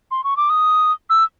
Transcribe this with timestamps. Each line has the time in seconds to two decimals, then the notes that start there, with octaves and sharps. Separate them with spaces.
0.11 C6
0.24 C#6
0.37 D6
0.50 D#6
1.10 E6